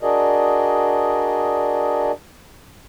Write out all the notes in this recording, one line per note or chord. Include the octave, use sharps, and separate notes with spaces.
D4 F#4 G#4 A#4 D5 D#5